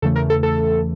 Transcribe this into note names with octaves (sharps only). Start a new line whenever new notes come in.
E2 C#3 E3 A3 A4
A#4
A4
A4